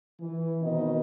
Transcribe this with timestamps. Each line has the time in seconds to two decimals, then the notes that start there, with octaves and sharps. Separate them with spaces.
0.21 E3
0.61 B2 D#3 C4 D#5